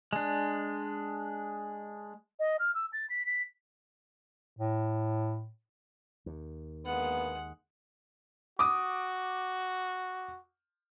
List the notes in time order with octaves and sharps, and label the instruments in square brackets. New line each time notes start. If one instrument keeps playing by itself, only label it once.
[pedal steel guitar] G#3 D4
[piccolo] D#5
F6
E6
A6
B6
B6
[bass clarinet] A2
[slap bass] D#2
[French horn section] D3 A#3 B3 [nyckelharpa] G#3 F#5
[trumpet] F#4 [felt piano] D6 D#6